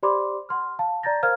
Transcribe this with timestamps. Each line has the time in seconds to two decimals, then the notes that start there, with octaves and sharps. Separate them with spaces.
0.03 G4 C5 D5 B5 C6 D6
0.49 F#5 C6 F6
0.79 F5 A5
1.03 D5 A#5 G6 A6 A#6
1.23 A#4 C5 F5 A#5 F6 G#6